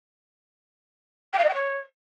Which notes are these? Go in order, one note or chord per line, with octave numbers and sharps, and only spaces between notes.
G5
F5
D#5
G5
C#5